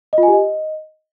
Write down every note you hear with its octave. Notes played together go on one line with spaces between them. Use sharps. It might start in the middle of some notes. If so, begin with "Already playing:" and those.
D#5
F4
G#5
G4
D#5